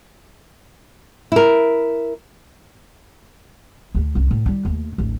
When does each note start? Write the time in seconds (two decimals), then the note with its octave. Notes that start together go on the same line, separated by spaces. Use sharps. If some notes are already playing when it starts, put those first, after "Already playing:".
1.32 E4 A#4
3.95 D2 A3
4.15 C2 F#2
4.31 A2
4.46 G3 E4
4.65 D#2 A3
4.98 D1 A1